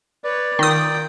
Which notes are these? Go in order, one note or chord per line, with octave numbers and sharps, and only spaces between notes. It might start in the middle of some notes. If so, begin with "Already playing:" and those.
B4 C#5 D5
D#3 F4 G5 D#6